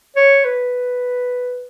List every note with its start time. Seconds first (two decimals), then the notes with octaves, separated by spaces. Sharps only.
0.16 C#5
0.45 B4